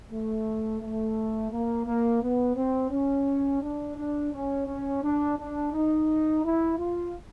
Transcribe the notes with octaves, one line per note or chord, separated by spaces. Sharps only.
A3
A3
A#3
A#3
B3
C4
C#4
D4
D4
C#4
C#4
D4
D4
D#4
E4
F4